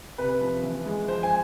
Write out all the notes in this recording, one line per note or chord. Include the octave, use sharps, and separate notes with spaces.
C3 B4
F3
E3
G#3
F3 C5
G#5